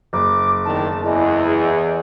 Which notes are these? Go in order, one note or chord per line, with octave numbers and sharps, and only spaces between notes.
F#1 D6
E2 D#3 A5
E2 E4 G#4 D#5